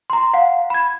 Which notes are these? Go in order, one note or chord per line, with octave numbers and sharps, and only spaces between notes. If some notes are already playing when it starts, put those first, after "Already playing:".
A#5 C6
F5 F#5
B5 G#6